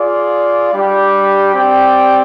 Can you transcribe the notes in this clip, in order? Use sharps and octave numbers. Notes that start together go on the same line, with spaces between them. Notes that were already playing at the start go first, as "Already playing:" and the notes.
Already playing: F4 G#4 D5
G3 D4 G4
C4 G4 D5 G5